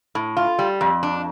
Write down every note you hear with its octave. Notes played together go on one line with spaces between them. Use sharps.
A2
F4
G3
F2
D4